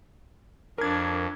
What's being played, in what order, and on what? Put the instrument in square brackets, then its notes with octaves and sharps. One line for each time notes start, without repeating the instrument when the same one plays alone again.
[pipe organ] F2 [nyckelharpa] D4 [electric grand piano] A#4 G#6